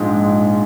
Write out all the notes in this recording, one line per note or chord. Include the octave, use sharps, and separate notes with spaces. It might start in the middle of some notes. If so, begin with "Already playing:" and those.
Already playing: A#1 G#2 F3 G#3